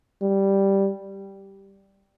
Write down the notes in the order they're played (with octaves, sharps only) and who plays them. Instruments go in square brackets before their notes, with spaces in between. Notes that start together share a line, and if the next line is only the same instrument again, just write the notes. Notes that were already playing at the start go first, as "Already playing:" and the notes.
[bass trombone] G3